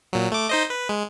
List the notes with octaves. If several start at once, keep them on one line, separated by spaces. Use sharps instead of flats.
A#2 F#3
A3 D6
D#4 C5 D#5
B4
G#3